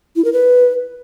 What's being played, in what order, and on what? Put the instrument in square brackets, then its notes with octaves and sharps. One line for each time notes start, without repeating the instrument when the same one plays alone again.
[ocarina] E4
A#4
B4